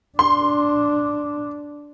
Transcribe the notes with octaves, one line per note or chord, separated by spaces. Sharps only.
D4 C6